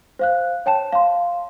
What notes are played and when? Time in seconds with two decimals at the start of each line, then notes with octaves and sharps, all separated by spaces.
0.19 C5 F5 F#6
0.66 C#5 G5 A5 E7
0.93 F5 C6